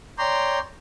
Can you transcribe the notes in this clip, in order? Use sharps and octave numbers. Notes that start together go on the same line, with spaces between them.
C#5 D5 G5 A#5 C6